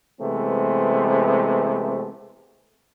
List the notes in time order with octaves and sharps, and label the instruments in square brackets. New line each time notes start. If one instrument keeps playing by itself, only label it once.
[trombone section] C3 E3 G#3 A3 B3 C4